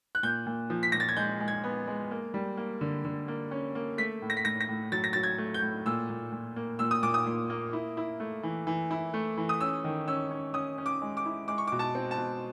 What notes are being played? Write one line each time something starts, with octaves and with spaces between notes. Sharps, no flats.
F#6
A#2 G6
A#2
F3
B6
A#2 A#6
A6
G#6
G#3 G6
G#3
G#6
B3
G#3
A#3
G3
A#3
D3
D3
A#3
C#4
A#3
A3 B6
A2
A#6
B6
A2 A#6
A#6
A2
F#3 A6
A#6
F#3 A6
G#6
A3
G6
A2
A#2 E6
A#2
A#2
A#3
A#2 E6
D#6
A#2 D6
D#6
A#2
A#3
E4
E4
A3
E3
E3
E4
A3
E3
D#6
C#4 E6
D#3
C#4 E6
C#4
C#4 D#6
C#4
D6
G#3
D6
E4
G#3 D6
C#6
B2 D6
A5
C4
A5
B2